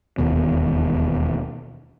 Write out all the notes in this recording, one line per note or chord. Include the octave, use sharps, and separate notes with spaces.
E1 D#2 B2